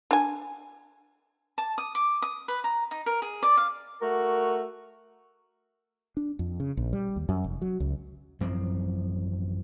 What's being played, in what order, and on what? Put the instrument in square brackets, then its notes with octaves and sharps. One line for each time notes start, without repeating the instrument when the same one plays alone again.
[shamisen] D4 G#5
[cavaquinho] A5
D#6
D6
D#6
B4
A#5
D#4
A#4
G#4
D5
F5
[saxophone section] A3 F#4 A#4
[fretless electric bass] D4
F2
C#3
A#1
G3
D#2
F#2
F1
F#3
C#2
[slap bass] A1 F#2 F3 C4